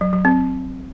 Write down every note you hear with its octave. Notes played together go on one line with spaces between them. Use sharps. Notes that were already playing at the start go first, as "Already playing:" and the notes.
F#3
F#3
C4